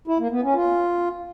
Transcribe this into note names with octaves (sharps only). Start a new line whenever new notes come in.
E4
A#3
B3
C#4
F4